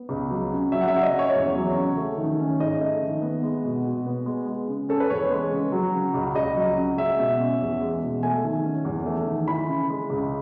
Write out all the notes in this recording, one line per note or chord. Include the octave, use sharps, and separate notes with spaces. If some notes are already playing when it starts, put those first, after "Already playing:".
Already playing: B3
C#2
F#3
C#3
F#3 E5
F#5
C#3 E5
D#5
C#4
C#5
E2 C#5
F#3
C#3
A3
D#3
C#4
G#2 D#5
A3
D#3
B3
G#3
B2
B2
B3
G#3
G#3
C#3
C#4 A4
B4
E2 C#5
G#3
C#3
F#3
C#3
C#2
C#2 D#5
F#3
C#3
G#3 E5
B2
C#4
E2
G#3
B2
A3 G#5
D#3
C#4
E2
A3
D#3
E3 B5
C#3
G#3
C#2